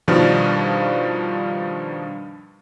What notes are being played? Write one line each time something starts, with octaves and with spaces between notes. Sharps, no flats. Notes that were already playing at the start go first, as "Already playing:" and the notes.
G2 B2 D#3 F3 G3 D4